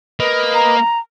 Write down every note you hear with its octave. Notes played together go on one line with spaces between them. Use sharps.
A#3 B4 D#5
A#5